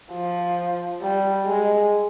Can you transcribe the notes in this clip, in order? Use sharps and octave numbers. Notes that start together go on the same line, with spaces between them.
F3
G3
G#3